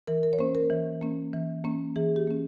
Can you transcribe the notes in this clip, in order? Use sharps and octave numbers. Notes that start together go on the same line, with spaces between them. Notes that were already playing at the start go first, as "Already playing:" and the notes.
E3 A#4
A#4
C#5
A#3 C#4 C5
A#4
E3
A#3 C#4
E3
A#3 C#4
E3 G#4
G4
A#3 C#4